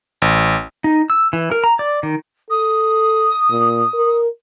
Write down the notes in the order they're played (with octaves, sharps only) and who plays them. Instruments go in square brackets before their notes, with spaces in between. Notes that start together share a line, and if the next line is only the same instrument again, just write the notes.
[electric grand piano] A1
[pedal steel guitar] D#4
E6
E3
A#4
A#5
D5
D#3
[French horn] A4 [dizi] D#6
[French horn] A#2
A#4